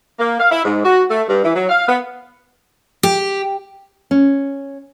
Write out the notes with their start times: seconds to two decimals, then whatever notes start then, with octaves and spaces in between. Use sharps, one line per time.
0.19 A#3
0.40 F5
0.52 E4
0.65 G#2
0.85 F#4
1.10 A3
1.29 G2
1.44 E3
1.56 F#3
1.69 F5
1.88 B3
3.03 G4
4.11 C#4